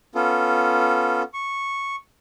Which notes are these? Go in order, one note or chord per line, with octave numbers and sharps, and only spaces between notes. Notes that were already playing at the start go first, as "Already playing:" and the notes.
B3 C#4 F4 A4
C#6